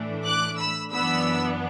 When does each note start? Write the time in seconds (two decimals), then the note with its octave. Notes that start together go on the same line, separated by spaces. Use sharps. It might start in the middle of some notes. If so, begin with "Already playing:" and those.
Already playing: A2 E3 A3 D4
0.26 D6 F#6
0.60 B5 E6
0.93 F#2 E3 B3 D4 B5 E6